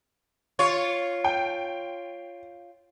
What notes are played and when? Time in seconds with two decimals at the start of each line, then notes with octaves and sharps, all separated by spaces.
0.59 F4 C#5
1.24 G5